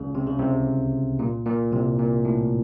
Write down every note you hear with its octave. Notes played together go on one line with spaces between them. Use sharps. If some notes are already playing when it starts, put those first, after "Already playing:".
Already playing: C#2 C#3
C3
C#3
C2 C3
A#2
A#2
C2 C3
A#2
A2